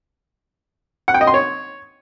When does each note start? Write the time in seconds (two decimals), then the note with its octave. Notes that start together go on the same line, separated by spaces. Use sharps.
1.08 F#5
1.14 G5
1.21 D#5
1.27 C6
1.34 C#5